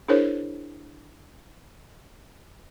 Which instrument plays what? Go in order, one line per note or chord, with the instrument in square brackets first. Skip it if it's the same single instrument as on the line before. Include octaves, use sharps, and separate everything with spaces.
[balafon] D4 E4 G#4 A#4 C5 C#5